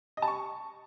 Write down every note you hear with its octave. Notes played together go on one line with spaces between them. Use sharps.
D#5
A5
C#6